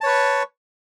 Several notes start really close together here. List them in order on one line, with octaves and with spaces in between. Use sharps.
A5 C#5 B4 C#6